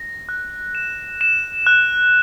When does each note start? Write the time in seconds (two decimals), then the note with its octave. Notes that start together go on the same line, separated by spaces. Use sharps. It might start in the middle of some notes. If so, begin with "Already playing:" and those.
Already playing: A#6
0.29 F#6
0.75 E7
1.21 E7
1.67 F#6